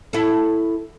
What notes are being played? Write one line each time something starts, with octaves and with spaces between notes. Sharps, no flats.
E4 A4